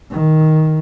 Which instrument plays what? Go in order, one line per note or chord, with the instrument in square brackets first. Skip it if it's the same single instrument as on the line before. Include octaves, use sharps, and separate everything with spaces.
[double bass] D#3